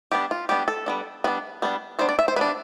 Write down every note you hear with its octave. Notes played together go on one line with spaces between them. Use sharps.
G3 B3 D4 G4
F4
G3 B3 D4 G4
A4
G3 B3 D4
G3 B3 D4 B4
G3 B3 D4
G3 B3 D4 C5
D5
E5
C5
G3 B3 D4 B4